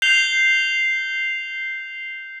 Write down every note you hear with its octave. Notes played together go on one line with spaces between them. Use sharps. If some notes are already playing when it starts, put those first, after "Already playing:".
G6 C7 F7 G7